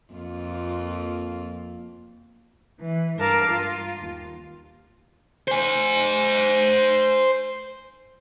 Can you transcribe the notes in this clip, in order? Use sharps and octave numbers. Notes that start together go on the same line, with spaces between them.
F2 A#3 F4
E3
G2 A#4 F5 A5 D6
F4
D#2
C5 G#5